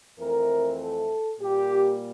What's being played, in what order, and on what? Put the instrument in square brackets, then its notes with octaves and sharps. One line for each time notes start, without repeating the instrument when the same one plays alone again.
[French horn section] F2 E3 A3 C4 A#4
A4
A#2 G3 A#3 G4